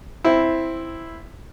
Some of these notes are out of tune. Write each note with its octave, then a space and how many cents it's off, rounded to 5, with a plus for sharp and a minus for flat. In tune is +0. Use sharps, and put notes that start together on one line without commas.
C4 +0 E4 +0